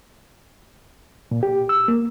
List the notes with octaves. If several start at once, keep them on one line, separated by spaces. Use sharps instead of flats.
A#2
G4
E6
A#3